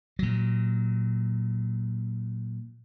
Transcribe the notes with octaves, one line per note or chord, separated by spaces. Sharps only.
A#2 F#3